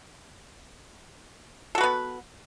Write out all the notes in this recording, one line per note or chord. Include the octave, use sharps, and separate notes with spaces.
B3 F#4 A4 B4